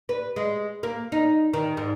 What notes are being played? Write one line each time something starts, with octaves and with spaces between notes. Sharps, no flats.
B4
G#3
A#3
D#4
D#3
G#2